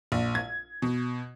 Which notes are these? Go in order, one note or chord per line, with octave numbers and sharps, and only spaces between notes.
A#1
G#6
B2